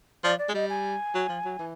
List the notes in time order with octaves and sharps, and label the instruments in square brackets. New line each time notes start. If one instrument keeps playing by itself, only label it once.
[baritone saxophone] F3 [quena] D5
[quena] D5
[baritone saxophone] G#3
[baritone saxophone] G3 [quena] D#5
[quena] G#5
[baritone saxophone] F#3
F3
F#3
E3